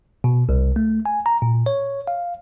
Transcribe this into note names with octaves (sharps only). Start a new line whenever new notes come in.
B2
C2
A3
G#5
A#5
A#2
C#5
F5